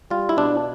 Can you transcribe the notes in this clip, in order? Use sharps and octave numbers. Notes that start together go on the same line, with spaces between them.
G3 F4
E4
B2 D4